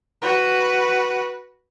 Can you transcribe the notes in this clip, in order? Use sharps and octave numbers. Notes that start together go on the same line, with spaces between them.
F#4 B4